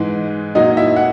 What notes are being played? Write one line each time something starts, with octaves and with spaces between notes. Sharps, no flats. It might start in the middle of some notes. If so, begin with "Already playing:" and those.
Already playing: G#2 E3 G#3 D#4
A#2 F#3 A#3 D#4 D#5
E4 E5
F#5